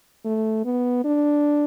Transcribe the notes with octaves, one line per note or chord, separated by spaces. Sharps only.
A3
B3
D4